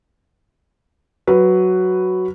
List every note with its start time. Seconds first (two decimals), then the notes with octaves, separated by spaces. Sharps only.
1.27 F#3 B4